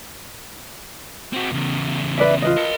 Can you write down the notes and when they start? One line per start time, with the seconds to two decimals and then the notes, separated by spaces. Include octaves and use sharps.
1.33 C4 F#4
1.52 E2 C#3
2.18 B4 D5 E5
2.42 F4 B4 D#5
2.57 A#4 A5